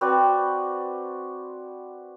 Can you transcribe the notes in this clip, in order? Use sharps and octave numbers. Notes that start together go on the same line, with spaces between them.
C4 F#4 B4 D5